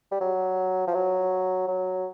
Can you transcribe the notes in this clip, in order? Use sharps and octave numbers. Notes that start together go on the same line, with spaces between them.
G3
F#3
F3
F#3
F#3